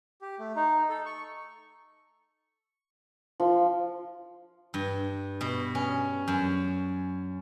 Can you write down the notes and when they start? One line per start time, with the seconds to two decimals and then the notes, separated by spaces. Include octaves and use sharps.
0.21 G4
0.39 A3
0.56 D#4
0.90 A4
1.06 C#6
3.40 F3
4.74 G2
5.41 B2
5.75 C#4
6.28 F#2